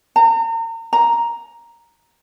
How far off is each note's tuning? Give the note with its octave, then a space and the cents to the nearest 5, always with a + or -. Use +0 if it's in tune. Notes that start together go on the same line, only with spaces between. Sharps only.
A#5 -40
A#5 +5